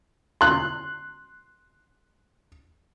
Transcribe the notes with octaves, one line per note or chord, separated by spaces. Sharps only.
C6 F#6